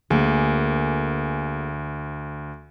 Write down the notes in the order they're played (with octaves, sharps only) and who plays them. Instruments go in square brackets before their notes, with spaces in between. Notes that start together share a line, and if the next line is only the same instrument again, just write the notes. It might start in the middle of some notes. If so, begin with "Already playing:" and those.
[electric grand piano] D2 [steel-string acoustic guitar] A#3 G#4